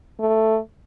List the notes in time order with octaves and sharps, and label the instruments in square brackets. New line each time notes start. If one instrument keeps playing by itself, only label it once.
[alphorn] A3